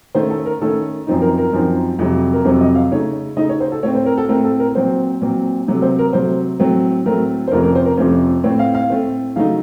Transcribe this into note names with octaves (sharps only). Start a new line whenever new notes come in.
D#3 A3 C#4 C5
A4
A#4
D#3 A3 C#4 A4
F#2 F3 C4 D#4
A#4
A#4
F#2 F3 C4 D#4
F2 C3 F#3
A#4
F2 C3 F#3 C5
D#5
F5
C#3 A3 D#4 C#5
C#3 A3 D#4 D#5
C#5
C5
A4
A2 A3 C4 C#5
C5
A#4
A4
A2 A3 C4 A#4
A4
A#4
A#2 F#3 C4 C5
A#2 F#3 C4
C3 F#3 A3
C5
A#4
C3 F#3 A3 C5
A2 F#3 A3 C4
A2 F#3 A3 C4 A#4
C5
F2 C3 F3 A3 C#4 A#4
A#4
C5
A#4
F2 C3 F3 A3 C#4 C5
A2 A3 C4 C#5
F5
F5
A2 A3 C4
C#3 F#3 A3 D#4 F5